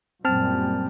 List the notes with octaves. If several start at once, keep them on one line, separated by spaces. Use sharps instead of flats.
F#2 A#2 G3 C4 A5 F6